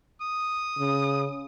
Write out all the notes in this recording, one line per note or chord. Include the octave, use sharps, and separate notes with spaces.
D#6
C#3